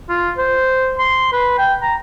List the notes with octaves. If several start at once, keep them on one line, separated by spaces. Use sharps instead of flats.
F4
C5
C6
B4
G5
A#5